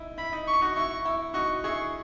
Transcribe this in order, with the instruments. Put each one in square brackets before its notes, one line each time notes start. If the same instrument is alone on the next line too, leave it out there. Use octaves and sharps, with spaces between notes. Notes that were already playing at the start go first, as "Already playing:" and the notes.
Already playing: [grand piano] D#4 E4
[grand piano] E4 [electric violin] B5
[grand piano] D#4
[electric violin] C#6
[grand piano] D#4 F#4
[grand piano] E4 [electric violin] C#6
[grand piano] E4
[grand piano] D#4 F#4 [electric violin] C#6
[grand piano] E4 G#4 [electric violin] C#6